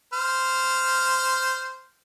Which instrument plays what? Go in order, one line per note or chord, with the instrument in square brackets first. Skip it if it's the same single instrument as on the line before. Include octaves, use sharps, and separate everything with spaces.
[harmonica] C5 F6